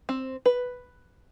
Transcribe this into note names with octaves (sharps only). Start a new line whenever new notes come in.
C4
B4